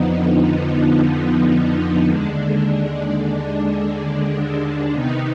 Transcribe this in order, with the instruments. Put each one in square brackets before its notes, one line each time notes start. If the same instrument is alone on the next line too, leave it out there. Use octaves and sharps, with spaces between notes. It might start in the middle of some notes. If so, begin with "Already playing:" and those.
Already playing: [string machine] F2 D3 F3 B3 D#4
D#2 D3 G#3 D4
C3 D#3 B3 D#4